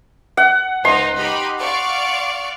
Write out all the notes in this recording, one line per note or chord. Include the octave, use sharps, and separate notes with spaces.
F#5
C#2 D#4 C5 C6
D#4 G4 B5
D5 F5 C#6